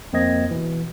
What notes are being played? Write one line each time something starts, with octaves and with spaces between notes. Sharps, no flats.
F2 A#3 C4 D#5 G#6 A#6
B2 E3